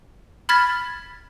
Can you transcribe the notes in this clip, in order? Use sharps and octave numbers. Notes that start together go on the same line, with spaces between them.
B5 F6 G#6 A6 B6